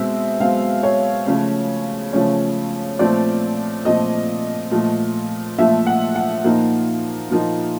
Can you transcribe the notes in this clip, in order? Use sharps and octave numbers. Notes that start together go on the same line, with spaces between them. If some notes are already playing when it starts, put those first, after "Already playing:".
Already playing: B2 G#3 C4 E5
B2 G#3 C4 F5
C#5
C#3 F3 A3 C#4
C#3 F3 A3 C#4
A#2 F3 A3 C4 D5
A#2 F3 A3 C4 D#5
A#2 F3 A3
A#2 F3 A3 E5
F#5
F#5
A#2 F3 A#3 D#4
A#2 F3 A#3 D#4